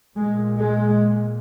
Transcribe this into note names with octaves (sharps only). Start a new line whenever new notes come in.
A#2 G#3
G#3